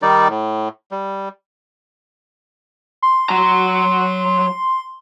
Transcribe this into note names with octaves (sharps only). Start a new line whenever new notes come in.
D#3 G3 D#4 D5
A2
G3
C6
F#3 A#5